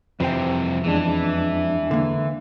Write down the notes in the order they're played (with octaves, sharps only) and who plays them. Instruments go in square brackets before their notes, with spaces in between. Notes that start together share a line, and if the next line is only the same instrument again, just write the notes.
[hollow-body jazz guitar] F2 C5 G5 [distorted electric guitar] C3 E3
[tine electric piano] E2 G#3 D4 [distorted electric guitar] E3
[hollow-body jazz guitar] D3 A#3